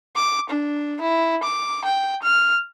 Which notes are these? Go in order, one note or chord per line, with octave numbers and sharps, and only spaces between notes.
D6
D4
E4
D6
G5
F6